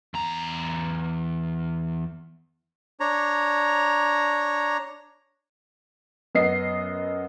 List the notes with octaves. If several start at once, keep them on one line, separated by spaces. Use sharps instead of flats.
E2 A#5
D4 C#5 A#5
F#2 B3 D#5 C7